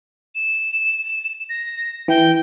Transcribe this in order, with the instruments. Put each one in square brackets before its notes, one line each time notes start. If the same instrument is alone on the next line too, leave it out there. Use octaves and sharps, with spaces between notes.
[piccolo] E7
A#6
[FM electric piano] E3 [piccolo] G5